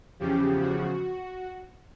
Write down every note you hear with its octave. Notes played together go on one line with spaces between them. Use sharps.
E2 C#3 F3 G4
F#4